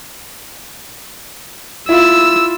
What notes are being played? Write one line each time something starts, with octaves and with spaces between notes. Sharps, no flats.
E4 F4 E6